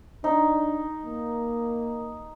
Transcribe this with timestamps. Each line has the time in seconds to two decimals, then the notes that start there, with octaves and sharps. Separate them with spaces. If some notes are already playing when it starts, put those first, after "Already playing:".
0.24 D4 D#4
1.06 A#3